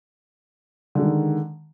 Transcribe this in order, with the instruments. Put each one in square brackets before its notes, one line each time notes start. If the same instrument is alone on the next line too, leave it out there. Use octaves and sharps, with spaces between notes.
[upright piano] D3
G#3
D#3